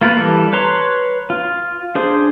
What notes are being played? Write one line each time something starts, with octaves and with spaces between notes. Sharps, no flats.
A#3 F4 A#4 B4
E3 G3 A4
B4 C#5 A#5 C6
F4
D4 G#4 C5